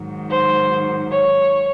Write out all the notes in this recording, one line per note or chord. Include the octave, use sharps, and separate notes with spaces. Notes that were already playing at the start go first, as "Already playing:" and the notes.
Already playing: G#2 D#3 F#3
C5
C#5